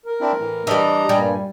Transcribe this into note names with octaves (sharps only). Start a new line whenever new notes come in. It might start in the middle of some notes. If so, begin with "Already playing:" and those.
A#4
C4 D4 E4
A2 E3
E3 G3 D4 D#5 A#5
G2 A#2 G3 G#5